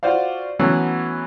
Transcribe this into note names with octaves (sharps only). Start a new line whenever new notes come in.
F4 F#4 C5 D5 F5
E3 F#3 A3 B3 C#4